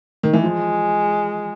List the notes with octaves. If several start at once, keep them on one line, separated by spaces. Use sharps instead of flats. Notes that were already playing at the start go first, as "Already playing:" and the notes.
D#3
E3
F3 G#3